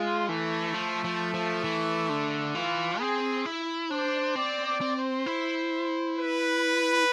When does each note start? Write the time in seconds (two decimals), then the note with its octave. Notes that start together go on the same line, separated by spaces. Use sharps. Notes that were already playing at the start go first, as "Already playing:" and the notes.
Already playing: G#3 F4
0.29 E3 A3
0.74 F3
1.04 F3
1.34 F3
1.64 E3
2.09 D3
2.55 E3 F4
3.00 C4 G#4
3.45 E4
3.91 D4 C5
4.36 C4 D5
4.65 D5
4.81 C4
4.95 C5
5.26 E4
6.16 B4